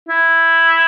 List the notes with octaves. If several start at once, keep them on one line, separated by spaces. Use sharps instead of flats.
E4